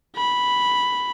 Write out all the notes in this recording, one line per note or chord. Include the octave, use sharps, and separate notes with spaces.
B5